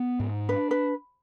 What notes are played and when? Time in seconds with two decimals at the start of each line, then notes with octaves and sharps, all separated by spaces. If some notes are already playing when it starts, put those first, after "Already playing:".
Already playing: B3
0.20 G#2
0.49 D4 B4
0.71 B4